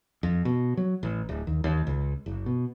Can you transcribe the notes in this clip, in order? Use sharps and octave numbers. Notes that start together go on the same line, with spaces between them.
F2
B2
F#3
A1
D1
D#2
D#2
C#2
F#1
B2